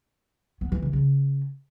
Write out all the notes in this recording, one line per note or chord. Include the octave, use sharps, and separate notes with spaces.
B3
E3
C#3
C#3